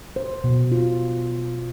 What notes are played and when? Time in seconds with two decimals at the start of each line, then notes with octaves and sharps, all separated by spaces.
0.16 C5
0.44 B2
0.72 F4